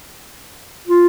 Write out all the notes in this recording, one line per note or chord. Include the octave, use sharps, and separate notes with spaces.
F4